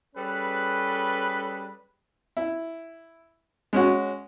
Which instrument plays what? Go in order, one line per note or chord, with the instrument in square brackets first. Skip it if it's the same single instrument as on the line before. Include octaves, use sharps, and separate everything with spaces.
[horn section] G3 C#4 G#4 A4 B4
[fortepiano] E4
G#3 C#4 F#4